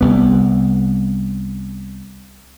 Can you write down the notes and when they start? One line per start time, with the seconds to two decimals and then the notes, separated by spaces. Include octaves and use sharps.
0.01 C2 B3